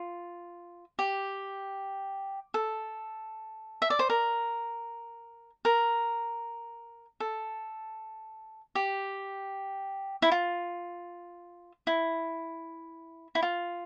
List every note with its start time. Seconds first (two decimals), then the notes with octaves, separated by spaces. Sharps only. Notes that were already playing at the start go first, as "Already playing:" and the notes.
Already playing: F4
0.99 G4
2.54 A4
3.82 E5
3.90 D5
3.99 C5
4.10 A#4
5.65 A#4
7.20 A4
8.75 G4
10.22 E4
10.32 F4
11.87 E4
13.35 E4
13.43 F4